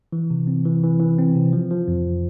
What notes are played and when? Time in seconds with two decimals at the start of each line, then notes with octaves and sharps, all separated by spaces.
0.13 E3
0.30 C3
0.47 C4
0.65 E3
0.83 E3
1.00 E3
1.18 C4
1.35 C3
1.53 F3
1.71 F3
1.88 F2